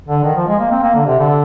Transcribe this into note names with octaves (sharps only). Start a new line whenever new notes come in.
D3
D#3
F3
G#3
A#3
C4
A#3
D3
C3
D3